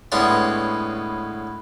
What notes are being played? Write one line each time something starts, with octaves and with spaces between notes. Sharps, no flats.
A2 G#3 B3 C#4 D4 C6